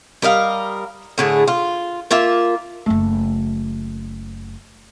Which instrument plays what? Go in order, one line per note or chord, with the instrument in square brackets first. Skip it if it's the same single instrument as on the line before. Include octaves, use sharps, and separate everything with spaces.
[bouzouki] G3 A#4 D#5 F5
A2 D3 G#4
F4
A#3 F4 E5
[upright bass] F#1 A3